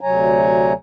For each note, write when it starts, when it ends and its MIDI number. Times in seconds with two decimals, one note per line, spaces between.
0.01 0.73 38
0.01 0.73 48
0.01 0.73 54
0.01 0.73 73
0.01 0.73 80
0.01 0.73 82